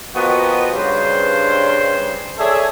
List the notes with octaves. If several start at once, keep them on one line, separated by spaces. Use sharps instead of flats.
F3 A#3 B3 F#4 G4 D#5
G2 C#3 C5
G#4 A4 C#5 D5 E5